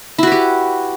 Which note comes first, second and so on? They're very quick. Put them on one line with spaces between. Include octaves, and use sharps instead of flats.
E4 F#4 B4 G4